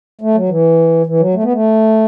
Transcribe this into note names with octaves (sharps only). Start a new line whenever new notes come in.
A3
F#3
E3
E3
F#3
A3
B3
A3